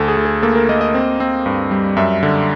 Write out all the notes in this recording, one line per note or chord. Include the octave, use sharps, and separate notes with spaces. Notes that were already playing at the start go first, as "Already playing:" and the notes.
Already playing: D2 A4
G#4
D2
G#4
A#3 A4
A#4
A#3 D#5
D#5
C4
C4
G2
G3
F#2 E5
D3